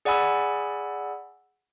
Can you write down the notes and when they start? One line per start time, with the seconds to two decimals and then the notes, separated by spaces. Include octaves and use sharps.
0.05 G#4 D5 F#5 G#5 B5 E6